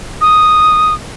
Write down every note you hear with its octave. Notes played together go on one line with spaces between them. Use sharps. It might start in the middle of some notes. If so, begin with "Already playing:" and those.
D#6